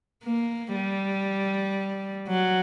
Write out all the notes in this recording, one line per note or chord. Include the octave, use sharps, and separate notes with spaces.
A#3
G3
F#3